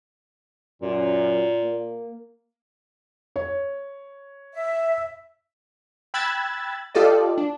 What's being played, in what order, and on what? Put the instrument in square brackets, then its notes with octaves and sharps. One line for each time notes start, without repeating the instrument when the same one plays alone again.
[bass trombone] F#2 [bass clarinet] A#2
[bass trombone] A#3
[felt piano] C#5
[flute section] E5
[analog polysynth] G5 B5 E6 F#6 G#6 A6
F4 G4 A4 D5 D#5
D4